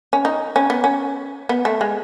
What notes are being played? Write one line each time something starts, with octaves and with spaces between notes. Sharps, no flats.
C#4
D#4
C#4
B3
C#4
B3
A3
G#3